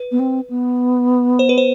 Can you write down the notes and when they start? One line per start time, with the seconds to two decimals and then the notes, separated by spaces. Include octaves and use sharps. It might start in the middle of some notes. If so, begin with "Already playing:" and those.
Already playing: B4
0.12 B3
0.19 C4
0.50 B3
1.39 C5
1.49 B4
1.58 C5